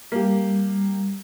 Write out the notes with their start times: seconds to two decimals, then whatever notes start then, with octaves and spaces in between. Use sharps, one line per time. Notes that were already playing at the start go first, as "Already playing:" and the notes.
0.12 G3 A#3 G4